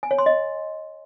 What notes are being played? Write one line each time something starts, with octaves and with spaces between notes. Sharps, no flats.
G#5
C#5
C6
D#5